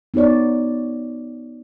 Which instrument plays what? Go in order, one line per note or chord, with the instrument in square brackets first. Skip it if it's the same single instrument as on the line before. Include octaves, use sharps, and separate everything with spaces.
[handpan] B3 D#4 F#4 C#5 D5